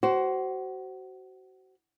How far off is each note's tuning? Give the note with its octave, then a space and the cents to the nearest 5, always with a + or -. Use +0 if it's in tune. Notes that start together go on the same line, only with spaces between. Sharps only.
F#4 +30 C5 +0